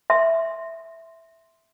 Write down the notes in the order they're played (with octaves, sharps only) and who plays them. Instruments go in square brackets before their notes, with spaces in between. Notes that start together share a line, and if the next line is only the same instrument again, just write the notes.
[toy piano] E5 C6